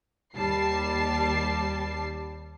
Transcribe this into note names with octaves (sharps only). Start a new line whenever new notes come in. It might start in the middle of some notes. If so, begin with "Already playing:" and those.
D#2 G3 A5 C7